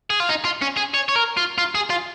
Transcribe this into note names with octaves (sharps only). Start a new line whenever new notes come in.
G#4
F4
D#4
F4
C#4
G#4
C#5
C#5
A#4
F4
F4
G#4
F4